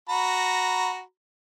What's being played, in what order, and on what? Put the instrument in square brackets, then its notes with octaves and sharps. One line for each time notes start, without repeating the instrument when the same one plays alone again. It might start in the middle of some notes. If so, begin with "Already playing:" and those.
[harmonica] F#4 A#5 B5